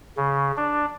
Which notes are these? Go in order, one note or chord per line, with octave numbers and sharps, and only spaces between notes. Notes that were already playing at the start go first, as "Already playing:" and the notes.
C#3
D4